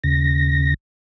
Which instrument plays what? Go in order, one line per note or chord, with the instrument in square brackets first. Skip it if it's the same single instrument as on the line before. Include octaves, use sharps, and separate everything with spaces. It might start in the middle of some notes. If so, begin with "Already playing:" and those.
[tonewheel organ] D#2 C#3 A#6